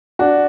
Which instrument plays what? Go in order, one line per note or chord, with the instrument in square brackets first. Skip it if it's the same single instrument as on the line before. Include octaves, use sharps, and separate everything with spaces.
[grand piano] D4 F#4